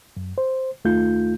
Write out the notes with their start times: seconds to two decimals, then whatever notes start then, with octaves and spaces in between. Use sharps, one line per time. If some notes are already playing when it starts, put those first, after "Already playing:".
0.17 F#2
0.38 C5
0.85 D#2 A3 D#4 F4 G6